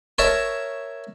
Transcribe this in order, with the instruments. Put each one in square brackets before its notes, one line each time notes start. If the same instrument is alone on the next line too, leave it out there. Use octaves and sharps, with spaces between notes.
[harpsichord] A#4 C#5 E5 A5 A#5